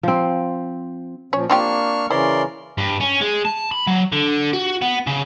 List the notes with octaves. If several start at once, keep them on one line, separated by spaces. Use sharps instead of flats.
F3 C4
A#2 F3 C#4 C#5
A#3 C4 D4 F4 G4 C#6 F6
C#3 E3 C#4 E4 A#4 C5 D5 C6
G2
C#4
G#3
A5
B5
F#3
D3
F#4
B3
C#3